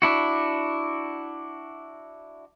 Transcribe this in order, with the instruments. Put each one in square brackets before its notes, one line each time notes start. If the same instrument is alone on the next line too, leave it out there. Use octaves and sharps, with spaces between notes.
[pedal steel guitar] D4 E4 F#4